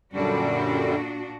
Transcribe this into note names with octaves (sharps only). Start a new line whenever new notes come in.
F#2 A#2 D3 G3 D4 F#4